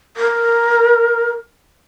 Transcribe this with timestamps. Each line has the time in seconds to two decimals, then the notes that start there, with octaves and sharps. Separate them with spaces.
0.17 A#4